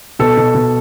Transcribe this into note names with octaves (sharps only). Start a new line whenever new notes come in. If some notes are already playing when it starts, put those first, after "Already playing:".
B2 A4
B2
B2